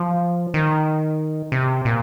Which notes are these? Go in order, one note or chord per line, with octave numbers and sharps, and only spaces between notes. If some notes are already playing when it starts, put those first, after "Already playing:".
Already playing: F3
D#3
C3
A#2